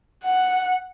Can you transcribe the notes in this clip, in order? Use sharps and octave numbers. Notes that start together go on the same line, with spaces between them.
F#5